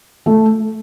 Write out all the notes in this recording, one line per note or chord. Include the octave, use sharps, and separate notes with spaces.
A3